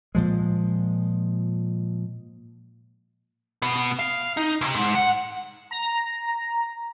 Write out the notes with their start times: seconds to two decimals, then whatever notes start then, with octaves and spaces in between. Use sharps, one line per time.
0.15 A#2 F3 G#3
3.62 B2 B3
3.99 F5
4.37 D#4
4.61 C#2 C3
4.75 G#2
4.95 F#5
5.71 A#5